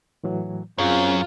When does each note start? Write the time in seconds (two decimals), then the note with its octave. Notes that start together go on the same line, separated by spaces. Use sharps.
0.24 A2 E3 F#3
0.78 F#2 C4 C#4 F4 G#4 C#5